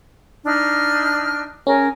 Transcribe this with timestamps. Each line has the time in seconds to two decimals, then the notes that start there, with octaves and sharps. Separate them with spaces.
0.45 D4 D#4 F6
1.67 C#4 G#4 A#4